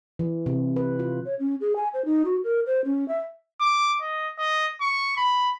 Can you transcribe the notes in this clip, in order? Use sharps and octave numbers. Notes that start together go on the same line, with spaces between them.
E3
C3
B4
F4
C#5
C#4
G#4
G#5
C5
D#4
F#4
A#4
C5
C#4
E5
D6
D#5
D#5
C#6
B5